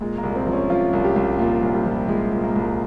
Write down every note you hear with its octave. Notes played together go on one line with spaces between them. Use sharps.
A#2 G#3
A#3
C2
C4
F3
C#4
F3 F4
C2
G4
C2
A#2 F4
C2
G3
F3
F3 G#3
A#2
A#3
C2